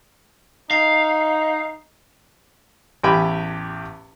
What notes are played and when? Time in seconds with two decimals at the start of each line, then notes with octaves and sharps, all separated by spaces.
0.71 D#4 F5
3.03 A1 E2 G4 G5 G#5 B5